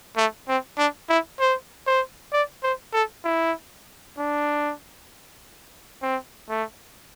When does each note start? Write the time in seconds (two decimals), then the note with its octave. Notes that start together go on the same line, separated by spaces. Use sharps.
0.17 A3
0.48 C4
0.78 D4
1.09 E4
1.40 C5
1.86 C5
2.33 D5
2.63 C5
2.93 A4
3.24 E4
4.17 D4
6.02 C4
6.49 A3